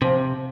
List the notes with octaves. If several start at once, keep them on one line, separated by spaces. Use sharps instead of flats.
C3 F3